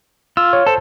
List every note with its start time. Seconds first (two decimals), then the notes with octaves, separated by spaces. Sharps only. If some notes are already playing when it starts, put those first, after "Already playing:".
0.37 F4 E6
0.53 C#5
0.66 A4 C5 A5